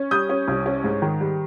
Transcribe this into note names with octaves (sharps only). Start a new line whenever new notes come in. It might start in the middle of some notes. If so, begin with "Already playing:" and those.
Already playing: C#4
G3 D#6 G6
C#4
C2
C#4
G#2
D#3
G3